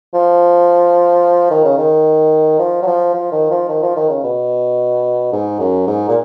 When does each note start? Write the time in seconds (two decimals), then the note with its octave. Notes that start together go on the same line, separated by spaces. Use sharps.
0.14 F3
1.51 D#3
1.64 C#3
1.78 D#3
2.59 F3
2.82 F#3
2.87 F3
3.14 F3
3.32 D#3
3.51 F3
3.69 D#3
3.83 F3
3.96 D#3
4.10 C#3
4.24 B2
5.32 G#2
5.60 F#2
5.87 G#2
6.09 A#2